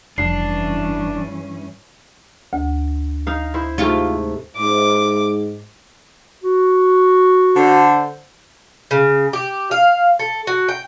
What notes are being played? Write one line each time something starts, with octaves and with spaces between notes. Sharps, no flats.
F1 G2 E3 C#4 D4 C7
D2
D#4 F5
E4 C5
G#2 C3 A3 F4
G#2 D6
F#4
D3 C5
C#3
G4
F5
A4
F#4
G5